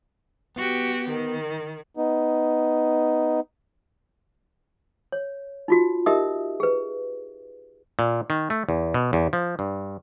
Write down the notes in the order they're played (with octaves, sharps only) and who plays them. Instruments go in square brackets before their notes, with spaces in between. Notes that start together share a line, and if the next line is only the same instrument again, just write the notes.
[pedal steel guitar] B3 [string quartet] F#4 G4
[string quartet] D#3
[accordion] B3 D#4
[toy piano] C#5
D#4 F4 F#4
D#4 G4 A#4 D#5 E5 D#6
G#4 B4
[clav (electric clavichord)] A#2
D#3
A3
E2
B2
E2
F3
G2